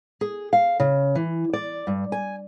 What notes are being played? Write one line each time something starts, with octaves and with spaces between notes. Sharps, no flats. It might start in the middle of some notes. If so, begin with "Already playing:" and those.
G#4
F5
C#3
E3
D5
G2
G#5